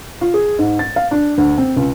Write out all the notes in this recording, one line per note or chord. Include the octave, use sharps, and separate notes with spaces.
F4
G#4
G#2
A6
F5
D4
D2
C4
C#2